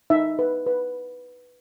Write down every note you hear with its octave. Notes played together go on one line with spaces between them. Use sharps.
D#4 E5
B4
B4